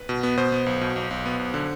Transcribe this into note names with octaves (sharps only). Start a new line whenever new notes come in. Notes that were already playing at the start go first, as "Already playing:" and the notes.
Already playing: B4
B2
B3
B2 C5
B3
B1
B2
B1
B1
B3
B1
D3